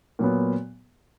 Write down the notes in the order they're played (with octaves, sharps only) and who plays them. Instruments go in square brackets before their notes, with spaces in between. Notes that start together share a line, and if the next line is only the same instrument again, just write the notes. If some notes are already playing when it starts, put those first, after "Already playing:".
[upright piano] A#2 F#3 B3